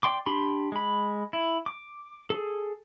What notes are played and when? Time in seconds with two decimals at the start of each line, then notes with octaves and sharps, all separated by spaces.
0.03 D5 G5 C6 D6
0.26 D4 G4 B5 C6
0.72 G#3 B5
1.33 E4
1.66 D6
2.30 G#4 A4